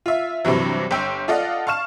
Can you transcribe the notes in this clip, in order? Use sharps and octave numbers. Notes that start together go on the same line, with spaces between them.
F4 E5
G2 C3 E3 F#3
G1 G5 E6
F4 A4 D5 D#5 F5 F#5
F5 A5 C#6 F6 E7